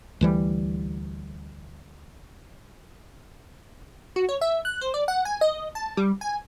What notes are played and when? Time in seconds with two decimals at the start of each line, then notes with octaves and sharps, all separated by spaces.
0.21 D2 E3 G3
4.16 F#4
4.29 C#5
4.41 E5
4.65 F#6
4.81 C5
4.94 D5
5.08 F#5
5.25 G#5
5.41 D#5
5.75 A5
5.97 G3
6.21 G#5